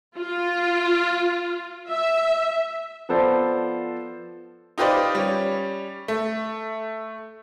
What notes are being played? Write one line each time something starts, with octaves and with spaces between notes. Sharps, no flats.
F4
E5
F3 B3 A4 C5 D5
D#4 F4 G4 B4 C5 D5
G3 C#4
A3